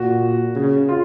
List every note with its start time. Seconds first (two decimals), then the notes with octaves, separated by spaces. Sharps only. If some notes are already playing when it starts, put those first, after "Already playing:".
Already playing: A#2 F#4
0.55 C#3
0.89 F4